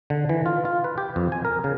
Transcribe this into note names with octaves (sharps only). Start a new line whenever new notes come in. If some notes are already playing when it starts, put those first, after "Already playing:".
D3
E3
F4
F4
B4
G4
F2
G#5
A#4
C#3